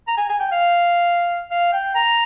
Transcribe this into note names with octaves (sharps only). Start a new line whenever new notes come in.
A#5
G#5
G#5
G5
F5
F5
G5
A#5